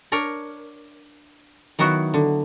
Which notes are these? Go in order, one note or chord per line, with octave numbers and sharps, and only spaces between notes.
D4 A#4 C#5
D#3 F#3 B3 E4 F#4
D3